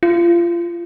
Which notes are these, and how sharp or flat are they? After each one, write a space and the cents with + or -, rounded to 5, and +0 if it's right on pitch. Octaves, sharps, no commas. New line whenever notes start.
F4 -30